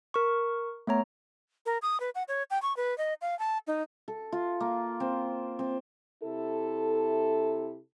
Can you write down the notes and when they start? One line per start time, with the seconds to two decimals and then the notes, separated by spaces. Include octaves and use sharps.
0.14 A#4 C#6
0.87 A3 B3 C#5 A#5
1.66 A#4
1.82 D#6
2.00 B4
2.15 F#5
2.28 C#5
2.50 G5
2.62 C#6
2.77 B4
2.98 D#5
3.22 F5
3.39 A5
3.67 D#4
4.08 A4
4.32 F4
4.60 A#3
5.00 C4
5.59 C4
6.23 C3 E4 A4